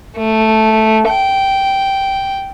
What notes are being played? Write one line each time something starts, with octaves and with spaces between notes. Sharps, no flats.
A3
G5